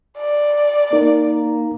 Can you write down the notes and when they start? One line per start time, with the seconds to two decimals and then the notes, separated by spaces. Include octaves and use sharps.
0.18 D5
0.93 A#3 D#4 A#4